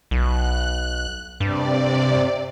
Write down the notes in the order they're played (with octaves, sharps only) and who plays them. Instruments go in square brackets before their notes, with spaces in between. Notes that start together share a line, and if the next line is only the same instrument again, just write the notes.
[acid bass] B1 [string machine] F#6
[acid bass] G2 [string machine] C3 D5